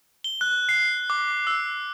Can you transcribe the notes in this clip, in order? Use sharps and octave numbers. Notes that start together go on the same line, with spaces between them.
G7
F#6
C7
D6
E6